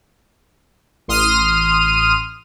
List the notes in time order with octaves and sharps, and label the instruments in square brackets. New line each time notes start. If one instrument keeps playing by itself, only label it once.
[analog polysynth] A1 C6 D#6 F6 D#7